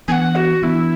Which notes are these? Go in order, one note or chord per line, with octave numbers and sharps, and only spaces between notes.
E3 B3 D4 F#5 G#5
F#4
E3 B3 D4 E4